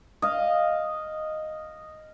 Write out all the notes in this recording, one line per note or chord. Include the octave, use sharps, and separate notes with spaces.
D#5 F5